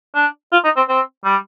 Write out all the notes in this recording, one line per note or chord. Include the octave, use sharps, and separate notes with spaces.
D4
F4
D#4
C4
C4
G3